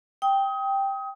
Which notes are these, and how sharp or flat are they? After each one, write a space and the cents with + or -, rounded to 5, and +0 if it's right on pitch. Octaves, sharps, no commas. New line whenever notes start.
G5 +0 D#6 +25